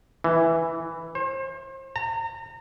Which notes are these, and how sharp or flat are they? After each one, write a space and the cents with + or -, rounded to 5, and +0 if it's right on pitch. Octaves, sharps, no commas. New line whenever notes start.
E3 +0
C5 +35
A#5 -35